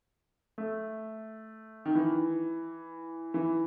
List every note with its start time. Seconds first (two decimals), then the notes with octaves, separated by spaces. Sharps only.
0.58 A3
1.86 D#3
1.95 E3
3.34 E3